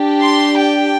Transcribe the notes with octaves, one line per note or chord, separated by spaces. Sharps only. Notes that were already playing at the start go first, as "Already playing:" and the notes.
Already playing: D4 G4
C6
G5